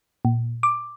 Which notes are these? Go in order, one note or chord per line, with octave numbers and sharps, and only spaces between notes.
A#2
D6